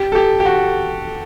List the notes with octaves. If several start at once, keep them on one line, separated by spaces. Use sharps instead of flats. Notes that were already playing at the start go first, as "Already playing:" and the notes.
Already playing: G4
A4
G4
G4
F#4